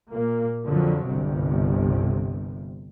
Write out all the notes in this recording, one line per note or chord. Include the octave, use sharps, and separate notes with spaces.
A#2 A#3
F2 D3 F3 F#3
G1 C2 C3